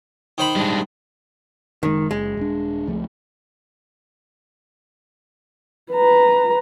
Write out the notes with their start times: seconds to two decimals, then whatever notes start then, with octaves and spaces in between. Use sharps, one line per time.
0.38 D#3 C5 B5
0.56 G3 G#3 D4
1.83 F#1 B2 D#3 G#3
2.11 F#1 G#3
2.37 D#1 D4
2.87 C#2 F3 A3
5.92 B4 A#5